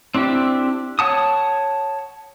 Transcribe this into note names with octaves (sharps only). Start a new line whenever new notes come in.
C4 D4 E4 G4
C#5 F#5 A5 D#6